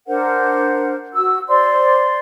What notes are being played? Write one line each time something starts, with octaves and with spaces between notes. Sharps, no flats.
D4 A#4 C5 F#5
F#4 E6
C5 D5 C6